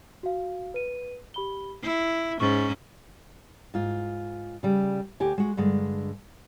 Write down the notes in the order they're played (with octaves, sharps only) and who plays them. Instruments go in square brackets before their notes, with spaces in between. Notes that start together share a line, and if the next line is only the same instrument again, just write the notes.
[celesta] F#4 F5
B4 D#7
G4 B5 G7
[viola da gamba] E4 [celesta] C7
[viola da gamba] G#2 C#4 [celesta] C#6 A6
[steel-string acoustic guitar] G#2 F4
C#3 G3
D2 G4 G#5
G#3 F#4
G2 D3 G#3